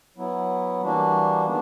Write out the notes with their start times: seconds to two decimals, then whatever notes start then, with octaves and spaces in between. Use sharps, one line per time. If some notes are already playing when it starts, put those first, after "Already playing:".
0.17 F#3 B3 E4
0.81 E3 G3 A#3 D4 F#4
1.45 D#3 G#3 B3 D4